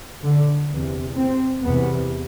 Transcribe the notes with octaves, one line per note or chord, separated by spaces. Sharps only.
D3
E2 C3
C4
E2 C3 B3